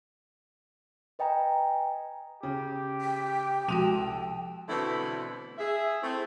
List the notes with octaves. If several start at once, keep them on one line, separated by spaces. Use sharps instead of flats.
B4 D#5 G5 G#5 A#5
C#3 G4
G5 B6
C2 F3 G#3 F#4 A4 D#7 F7
B2 D3 E3 A3 C4 E4
G#4 E5
A3 C4 E4